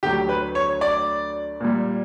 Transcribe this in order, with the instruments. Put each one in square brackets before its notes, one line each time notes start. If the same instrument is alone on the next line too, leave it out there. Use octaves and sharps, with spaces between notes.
[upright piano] D2 D3 F#3 G4
B4
C#5
D5
A#2 G3